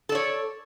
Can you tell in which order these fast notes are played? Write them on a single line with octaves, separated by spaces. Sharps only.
A4 D5 C#5